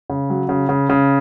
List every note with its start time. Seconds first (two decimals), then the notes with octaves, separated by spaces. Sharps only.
0.10 C#3
0.30 F#3
0.49 C#3
0.69 C#3
0.89 C#3